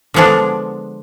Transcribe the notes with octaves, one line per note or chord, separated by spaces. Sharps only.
D3 F3 G#3 B3 D4